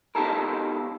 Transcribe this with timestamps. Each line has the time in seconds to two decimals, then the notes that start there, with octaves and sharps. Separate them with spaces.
0.15 B3 D#4 F4 G4 A4 A#4